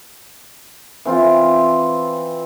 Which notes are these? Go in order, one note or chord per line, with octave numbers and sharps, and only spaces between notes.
E3 C4 F4